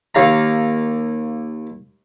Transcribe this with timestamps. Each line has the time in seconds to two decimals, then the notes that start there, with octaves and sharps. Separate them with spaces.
0.15 D#2 F5 A#5